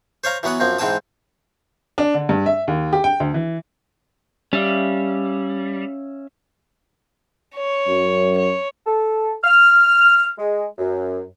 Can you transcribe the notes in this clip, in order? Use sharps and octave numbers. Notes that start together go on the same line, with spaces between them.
C5 C#5 F5 A#5
E3 F#3 B3 F#5 D#6
F#2 F3 C4
G#2 E3 C4 G5 A5 D#6
D4
D3
G2
E5
D#2
G4
G5
D2
E3
G3 C#4 E5 F5
C#5
F#2
C#5
A4
F6
G#3
F#2